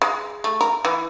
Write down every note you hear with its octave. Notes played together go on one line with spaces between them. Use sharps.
G#3
A3
A#4
E3